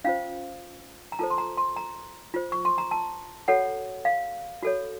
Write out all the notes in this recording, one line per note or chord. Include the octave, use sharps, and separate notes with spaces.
C#4 F4 C5 F5
A#5
F4 A4 C5 A5
C6
A#5
C6
A#5
F4 C5
C#6
C6
A#5
A5
F#4 A4 C#5 F#5
F5
F#4 A4 C#5